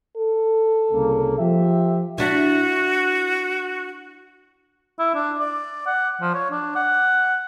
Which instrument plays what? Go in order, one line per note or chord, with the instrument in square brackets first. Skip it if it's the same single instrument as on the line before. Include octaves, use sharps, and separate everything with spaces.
[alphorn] A4
[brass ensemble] C2 C#3 A#3
F3 G4 E5
[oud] D4 E4 [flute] F#4
[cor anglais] E4
D4
D5
F#5
F3
C#5
D4
F#5